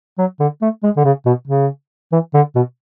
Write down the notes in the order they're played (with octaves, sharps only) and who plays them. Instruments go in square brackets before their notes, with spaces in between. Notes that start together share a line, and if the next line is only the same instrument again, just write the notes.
[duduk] F#3
D3
A3
G#3
D3
C#3
B2
C#3
E3
D3
B2